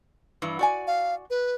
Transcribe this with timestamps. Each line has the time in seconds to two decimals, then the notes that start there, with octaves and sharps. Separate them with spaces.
0.42 G2 E3
0.59 F#4 D5 G#5
0.87 F5
1.30 B4